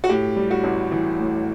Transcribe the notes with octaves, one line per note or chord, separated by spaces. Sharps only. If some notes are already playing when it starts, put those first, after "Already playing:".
F#4
A2 G4
G3
F#4
A1
E3
A2